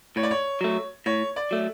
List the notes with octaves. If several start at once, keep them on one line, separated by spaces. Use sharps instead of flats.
A2 C#5
D5
C#5
F#3 A3
A2 C#5
D5
F#3 A3